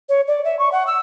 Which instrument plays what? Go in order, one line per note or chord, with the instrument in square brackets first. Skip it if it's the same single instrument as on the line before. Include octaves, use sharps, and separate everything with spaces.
[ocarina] C#5
D5
E5
C#6
F#5
E6